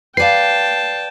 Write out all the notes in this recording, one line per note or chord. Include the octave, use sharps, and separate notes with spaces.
B4 D5 F5 G5 A5 C7